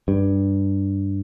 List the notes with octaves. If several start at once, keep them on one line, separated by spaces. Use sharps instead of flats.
G2